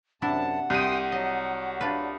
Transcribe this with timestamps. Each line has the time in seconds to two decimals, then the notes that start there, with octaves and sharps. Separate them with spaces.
0.22 F#2 C3 D4 E4 F#5 A5
0.70 C2 G5 C6 D#6 D#7
1.12 F#3 D#5
1.81 D4 F4 B4